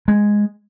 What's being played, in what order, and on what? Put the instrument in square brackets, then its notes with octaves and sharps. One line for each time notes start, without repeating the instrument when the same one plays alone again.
[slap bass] G#3